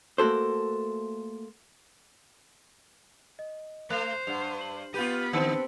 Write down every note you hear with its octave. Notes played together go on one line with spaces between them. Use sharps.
A3 A#3 F#4 A4 C5
D#5
A3 C5 F#6 F7
G2 F#5 F7
F#7
B3 F4 G4 B4 B5 G6 D#7
D3 C4 A5 E6 C#7